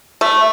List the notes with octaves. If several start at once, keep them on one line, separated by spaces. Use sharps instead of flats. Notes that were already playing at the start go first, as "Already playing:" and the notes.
A3